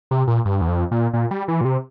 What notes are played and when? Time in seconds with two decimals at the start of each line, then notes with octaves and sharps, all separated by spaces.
0.11 C3
0.27 A#2
0.45 G2
0.61 E2
0.68 F2
0.91 A#2
1.13 A#2
1.31 G3
1.48 E3
1.61 A#2
1.65 C3